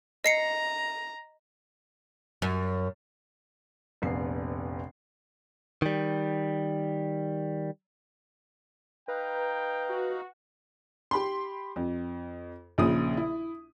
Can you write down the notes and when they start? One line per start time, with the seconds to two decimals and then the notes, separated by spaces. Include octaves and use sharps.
0.24 D#5 A#5 C7 C#7
2.42 F#2
4.02 F1 A#1 B3 C7
5.82 D#3 G3
9.08 D#4 B4 F5 G5 A#5
9.89 F#4
11.11 G4 B5 C6
11.76 F2
12.78 A#1 A#2 C#3 G#4 D#6
13.17 E4